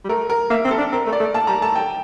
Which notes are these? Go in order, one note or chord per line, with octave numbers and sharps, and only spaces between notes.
G3
A3 A#4
A#4
A#3 E5
C4
A4
D4
C4 A#4
A3
D5
A3
A#3 A5
G3 A#5
A3 A5
G5